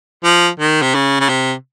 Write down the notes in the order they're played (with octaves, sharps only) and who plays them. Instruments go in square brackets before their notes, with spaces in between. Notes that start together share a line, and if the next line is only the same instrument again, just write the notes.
[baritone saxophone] F3
D#3
C3
C#3
C#3
C3